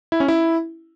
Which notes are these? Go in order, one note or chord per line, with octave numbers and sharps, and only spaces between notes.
E4
C#4
E4